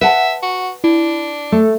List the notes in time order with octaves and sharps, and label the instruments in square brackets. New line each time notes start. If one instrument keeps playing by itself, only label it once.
[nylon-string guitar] B4 F#5 A5 [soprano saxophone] E5
[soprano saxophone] F#4
[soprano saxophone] D4 [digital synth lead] E4
[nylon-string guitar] A3 [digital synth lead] A4